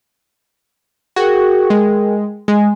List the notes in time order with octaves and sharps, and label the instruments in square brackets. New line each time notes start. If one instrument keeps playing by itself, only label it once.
[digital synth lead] F#4 [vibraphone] G#4 A#4 G5
[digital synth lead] G#3
[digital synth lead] G#3 [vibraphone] G#5